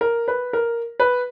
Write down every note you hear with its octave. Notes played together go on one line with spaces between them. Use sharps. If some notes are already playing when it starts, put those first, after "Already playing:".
A#4
B4
A#4
B4